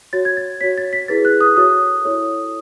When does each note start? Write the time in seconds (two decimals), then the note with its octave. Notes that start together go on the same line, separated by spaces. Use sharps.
0.13 F#4 C#5 A6
0.25 G#6
0.37 A6
0.61 F#4 C#5 B6
0.78 A6
0.93 B6
1.08 E4 G#4 B4 A6
1.25 F#6
1.41 D#6
1.56 F#4 A4 C#5 D#6
2.05 E4 A4 C#5